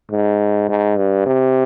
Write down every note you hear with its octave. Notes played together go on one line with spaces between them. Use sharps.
G#2
G#2
G2
C3